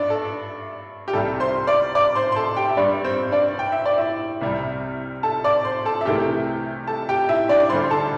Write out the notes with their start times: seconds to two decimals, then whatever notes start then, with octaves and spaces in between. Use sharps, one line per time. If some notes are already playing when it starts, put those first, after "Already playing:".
Already playing: G2 D4 D5 E5
0.10 A4
1.08 G4
1.13 C2 C3 G3 A4
1.40 C5 C6
1.67 D5 D6
1.95 D5 D6
2.15 C5 C6
2.32 C6
2.36 A4 A5
2.56 G4 G5
2.69 E5
2.77 G2 G3 D4 D5
3.04 C4 C5
3.32 D4 D5
3.59 G5
3.72 E5
3.86 D5
3.98 E4 E5
4.41 C2 C3 G3
5.23 A4 A5
5.44 D5 D6
5.65 C5 C6
5.85 A4 A5
6.01 E5
6.05 C2 C3 E3 A3 G4 G5
6.87 A4 A5
7.09 G4 G5
7.29 E4 E5
7.49 D4 D5
7.60 D6
7.70 D2 D3 G3 C5 C6
7.90 A4 A5